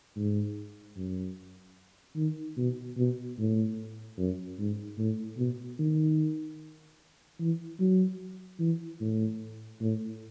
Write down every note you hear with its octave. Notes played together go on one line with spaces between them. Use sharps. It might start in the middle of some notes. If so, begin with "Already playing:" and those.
G#2
F#2
D#3
B2
B2
A2
F#2
G#2
A2
B2
D#3
E3
F#3
E3
A2
A2